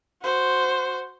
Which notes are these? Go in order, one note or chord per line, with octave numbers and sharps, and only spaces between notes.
F#4 C5